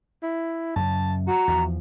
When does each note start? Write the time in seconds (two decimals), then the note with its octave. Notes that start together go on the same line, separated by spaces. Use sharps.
0.23 E4
0.76 F#2 C#3 A5
1.28 F#4 A#5
1.48 E2 F3